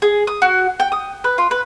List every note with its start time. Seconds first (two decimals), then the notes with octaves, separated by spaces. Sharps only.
0.02 G#4
0.27 D#6
0.42 F#4
0.80 G5
0.92 D#6
1.24 B4
1.38 F4
1.51 B4